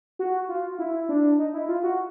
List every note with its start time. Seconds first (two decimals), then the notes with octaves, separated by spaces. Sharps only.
0.19 F#4
0.49 F4
0.79 E4
1.09 D4
1.38 D#4
1.53 E4
1.68 F4
1.83 F#4